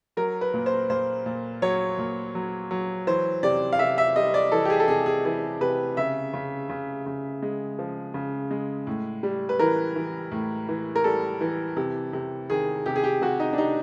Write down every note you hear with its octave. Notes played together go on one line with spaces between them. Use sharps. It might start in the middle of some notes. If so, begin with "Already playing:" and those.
F#3 A#4
B4
A#2
C5
A#2 C5
A#2
F#3 C#5
A#2
F#3
F#3
E3 C5
C3 D5
F5
C3 E5
E5
G3 D#5
D5
E3 A4
G4
G#4
A4
C3 G#4
G#4
E3 G#4
C3 B4
C#3 E5
C#3
C#3
C#3
G#3
F3
C#3
G#3
A2
G3
B4
E3 A#4
E3
A2
E3
A#4
G3 A4
E3
C3
C3
D#3 G#4
C3 G4
G#4
G4
C3 F#4
D#4
D4
C3 D#4